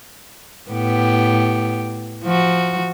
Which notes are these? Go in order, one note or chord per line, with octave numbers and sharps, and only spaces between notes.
A2 B3 G4
F3 F#4